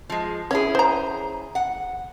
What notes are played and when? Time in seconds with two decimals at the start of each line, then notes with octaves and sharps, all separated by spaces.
0.10 F3 G#3
0.51 C#4 E4 G#4 C#5
0.75 C5 A#5
1.55 F#5